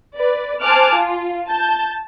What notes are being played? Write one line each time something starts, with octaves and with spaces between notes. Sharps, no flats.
B4 D5
C5 G#5 A5 D6 F6 F#6
F4
A5 G6